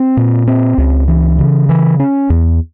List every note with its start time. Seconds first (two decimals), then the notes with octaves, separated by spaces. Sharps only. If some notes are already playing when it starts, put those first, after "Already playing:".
Already playing: C4
0.17 A#2
0.48 C4
0.78 C#2
1.08 E3
1.39 C#3
1.69 E3
2.00 C#4
2.30 E2